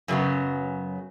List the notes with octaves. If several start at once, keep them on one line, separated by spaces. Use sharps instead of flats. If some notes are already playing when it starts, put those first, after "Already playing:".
F#2 C#3 F#3 B3